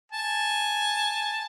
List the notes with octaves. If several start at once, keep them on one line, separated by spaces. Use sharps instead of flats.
G#5 A5